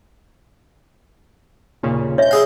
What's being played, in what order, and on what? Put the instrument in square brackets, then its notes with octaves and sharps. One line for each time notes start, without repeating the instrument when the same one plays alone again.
[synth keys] D#2 A#2 C#3
[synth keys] G#3 G6 [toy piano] C#5 E5
[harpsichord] E4 G#4 F5